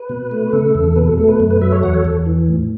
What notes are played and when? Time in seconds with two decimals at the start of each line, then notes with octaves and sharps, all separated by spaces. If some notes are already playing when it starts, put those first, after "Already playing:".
Already playing: B4
0.09 B2
0.31 A3
0.53 C#3 A4
0.75 E2
0.96 B2 B4
1.07 A4
1.18 A3 A4
1.28 B4
1.40 F#2
1.50 B4
1.61 F#3 B4 E5
1.72 A4 C#5
1.83 E2 C#5 F#5
1.94 A4 C#5
2.05 E2 A4
2.26 E3
2.48 A2